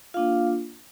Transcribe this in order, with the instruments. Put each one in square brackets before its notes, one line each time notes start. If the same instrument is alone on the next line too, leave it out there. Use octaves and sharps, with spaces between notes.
[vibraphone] A#3 D4 F4 F5